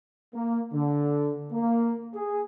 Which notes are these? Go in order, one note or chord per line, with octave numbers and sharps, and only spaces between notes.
A#3
D3
A#3
G#4